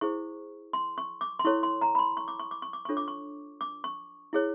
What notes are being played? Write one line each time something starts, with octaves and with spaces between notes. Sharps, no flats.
E4 G#4 C5 C#6
C6
C#6
D6
C6
E4 A4 C#5 C#6
C6
A#5
B5
C6
C#6
D6
C#6
D6
C#6
D6
D4 F4 A4 C#5 C#6
D6
C#6
D6
C#6
E4 G#4 C#5